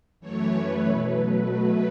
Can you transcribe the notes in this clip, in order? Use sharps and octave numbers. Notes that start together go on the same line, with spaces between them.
F#2 E3 A3 C#5
B4
B2 F#3 A3